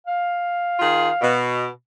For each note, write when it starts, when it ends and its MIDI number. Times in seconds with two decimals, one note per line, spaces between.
0.07 1.35 77
0.79 1.09 51
0.79 1.09 65
0.79 1.09 68
1.21 1.66 47